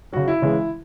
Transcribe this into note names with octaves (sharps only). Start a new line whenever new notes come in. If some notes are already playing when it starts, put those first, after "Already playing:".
C#3 F#3 F#4
E4
C#3 E3 G#3